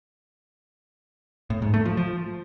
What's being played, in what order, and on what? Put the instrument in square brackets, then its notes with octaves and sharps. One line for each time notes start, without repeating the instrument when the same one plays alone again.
[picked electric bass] A2
G#2
A3
F3
F3